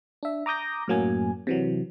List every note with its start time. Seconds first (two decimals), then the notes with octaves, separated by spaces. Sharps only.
0.23 D4 E5
0.46 A#5 D6 D#6 G6 A#6
0.88 F#2 A2 F#3 A#3 G#5
1.47 C3 E3 F#3